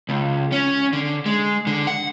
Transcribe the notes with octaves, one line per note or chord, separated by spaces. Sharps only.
C#2
C#4
D3
G#3
D3
F#5